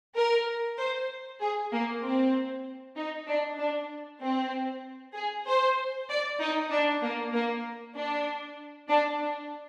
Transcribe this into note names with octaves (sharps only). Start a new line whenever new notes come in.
A#4
C5
G#4
A#3
C4
D#4
D4
D4
C4
G#4
C5
D5
D#4
D4
A#3
A#3
D4
D4
D4